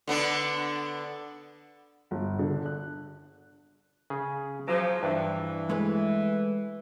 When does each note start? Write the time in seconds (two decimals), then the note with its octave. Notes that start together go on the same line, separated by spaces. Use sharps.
0.07 D3 B3 D4
2.11 G1
2.39 D3
2.66 F#6
4.10 C#3 G#4
4.68 F3 F#3 G#4
5.03 G2 E3 D4
5.70 G#3 A3 B4